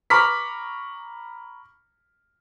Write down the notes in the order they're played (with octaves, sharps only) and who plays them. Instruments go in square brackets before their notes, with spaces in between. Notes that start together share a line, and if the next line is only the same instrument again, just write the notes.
[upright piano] A#5 B5 C#6 D6 F6 B6